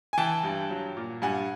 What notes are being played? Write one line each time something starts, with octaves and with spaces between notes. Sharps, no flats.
G#5
E3 G5 A5
G2
F#3
A#2
G2 F#5 G#5